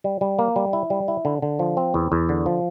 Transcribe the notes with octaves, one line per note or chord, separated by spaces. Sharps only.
G3
G3
A#3
G3
E4
G3
E4
D3
D3
F3
C4
E2
E2
D3
F3